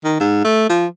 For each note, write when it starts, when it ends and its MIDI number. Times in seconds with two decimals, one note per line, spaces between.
0.04 0.18 51
0.20 0.43 44
0.44 0.68 57
0.70 0.86 53